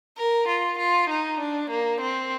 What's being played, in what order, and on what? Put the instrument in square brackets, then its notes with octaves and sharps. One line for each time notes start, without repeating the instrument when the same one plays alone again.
[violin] A#4
F4
F4
D#4
D4
A#3
C4